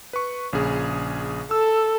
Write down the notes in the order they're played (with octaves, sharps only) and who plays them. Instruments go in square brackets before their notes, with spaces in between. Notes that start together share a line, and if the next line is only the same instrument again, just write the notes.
[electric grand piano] B4 C#6
A#1 C#3 G#4
[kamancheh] A4 [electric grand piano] E6